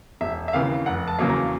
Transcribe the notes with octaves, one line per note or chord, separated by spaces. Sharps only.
E1 E5
E5
D#2 C#3 E3 F5
F1 F#5
A5
E2 C#3 F#3 A#3
A#5